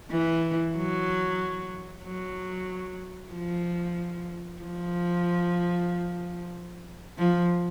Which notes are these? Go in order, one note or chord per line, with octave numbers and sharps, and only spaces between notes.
E3
F#3
F#3
F3
F3
F3